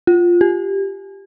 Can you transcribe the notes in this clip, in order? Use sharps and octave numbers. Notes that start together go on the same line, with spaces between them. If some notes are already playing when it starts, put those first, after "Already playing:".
F4
G4